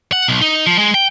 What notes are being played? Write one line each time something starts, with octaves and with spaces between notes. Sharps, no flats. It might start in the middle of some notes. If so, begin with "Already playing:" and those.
F#5
B1
D#4
F3
G#3
G5